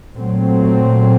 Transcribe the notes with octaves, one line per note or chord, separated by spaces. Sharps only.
A#2 F#3 A3 C4